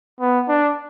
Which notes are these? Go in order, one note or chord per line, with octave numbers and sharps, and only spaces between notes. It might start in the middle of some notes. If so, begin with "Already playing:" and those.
B3
D4